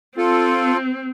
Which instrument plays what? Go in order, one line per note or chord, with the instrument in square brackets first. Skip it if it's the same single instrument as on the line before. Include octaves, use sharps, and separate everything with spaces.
[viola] C4 [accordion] F4 A4